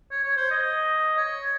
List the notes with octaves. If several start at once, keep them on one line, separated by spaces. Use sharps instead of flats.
C#5
C#5
C5
D#5
C#5